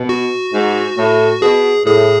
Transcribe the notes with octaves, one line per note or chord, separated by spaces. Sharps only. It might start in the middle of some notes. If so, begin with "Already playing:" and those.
Already playing: B2
F#4
G#2
A2
B2 G#4
A2 G#4